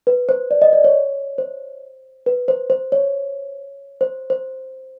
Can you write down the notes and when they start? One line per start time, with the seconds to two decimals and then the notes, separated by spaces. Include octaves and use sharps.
0.07 B4
0.29 C5
0.51 D5
0.62 D#5
0.73 D5
0.84 C#5
1.38 C5
2.26 B4
2.48 C5
2.70 C5
2.92 C#5
4.01 C5
4.30 C5